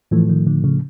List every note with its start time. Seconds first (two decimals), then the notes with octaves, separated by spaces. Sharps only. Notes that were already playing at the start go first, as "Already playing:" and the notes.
0.11 A2 E3 F3 A3
0.29 D#3
0.47 D3
0.64 C#3